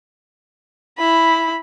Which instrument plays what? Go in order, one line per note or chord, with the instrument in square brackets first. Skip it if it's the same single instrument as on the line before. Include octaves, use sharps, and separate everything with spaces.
[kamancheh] E4 B5